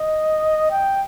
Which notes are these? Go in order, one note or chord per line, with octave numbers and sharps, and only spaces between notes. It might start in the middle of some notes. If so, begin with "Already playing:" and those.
Already playing: D#5
G5